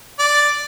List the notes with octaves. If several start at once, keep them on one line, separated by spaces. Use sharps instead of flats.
D5